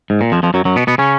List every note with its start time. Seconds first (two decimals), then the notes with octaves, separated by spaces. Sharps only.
0.10 G#2
0.21 A#2
0.32 F2 F3
0.43 F2 F3
0.54 F#2 F#3
0.65 F#2 F#3
0.76 B2 B3
0.87 B2 B3
0.98 C#3 C#4